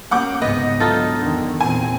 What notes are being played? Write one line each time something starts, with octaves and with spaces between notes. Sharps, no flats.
A#3 C#4 F#5 D6 G6
C#2 G#2 C3 B3 D#5
D3 F#3 D#4 F4 A4
E2 D3 D#3
E2 A#2 C4 G#5